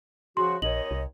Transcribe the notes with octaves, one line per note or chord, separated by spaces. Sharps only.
C#3 F3 F#4 C6
A#1 D#2 C#5 D#5 F#7
C2